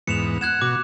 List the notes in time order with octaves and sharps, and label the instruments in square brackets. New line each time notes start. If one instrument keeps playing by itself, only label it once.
[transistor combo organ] E2 G#2 B3 [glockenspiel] C#7 E7 F7
[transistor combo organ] F#5 [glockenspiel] F#6 G#6 E7
[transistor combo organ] B2 F#4 [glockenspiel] D6